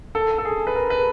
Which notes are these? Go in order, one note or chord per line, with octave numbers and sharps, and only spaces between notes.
A4
A4
G#4
B4
A#4
B4